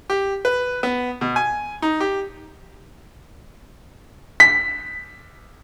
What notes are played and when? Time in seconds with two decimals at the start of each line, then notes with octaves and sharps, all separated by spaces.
0.10 G4
0.45 B4
0.83 B3
1.21 B2
1.36 G#5
1.82 D#4
2.00 G4
4.40 B6